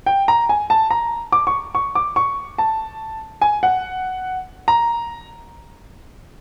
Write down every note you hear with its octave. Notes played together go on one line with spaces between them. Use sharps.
G5
A#5
G#5
A5
A#5
D6
C#6
C#6
D6
C#6
A5
G#5
F#5
A#5